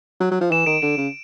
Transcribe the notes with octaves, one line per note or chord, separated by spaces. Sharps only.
F#3
F#3
F3
E3 E7
D#3 D7
D3 E7
C#3